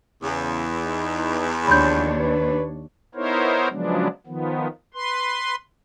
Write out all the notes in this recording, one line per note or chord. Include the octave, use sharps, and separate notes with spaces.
E2 C#3
D#4
D#2 F3 D4 C#5 B5 C6 G6
B4
B3 D#4 E4 A#4 C5 C#5
C#3 F3 F#3 G#3 B3 D4
D#3 F3 B3
B4 C6